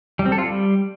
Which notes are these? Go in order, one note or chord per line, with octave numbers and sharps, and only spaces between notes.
G3
C4
A4
F4
G3